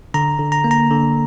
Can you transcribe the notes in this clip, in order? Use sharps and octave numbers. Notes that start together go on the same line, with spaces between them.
D3 A#5
D3
A#5
A#3
A#5
D3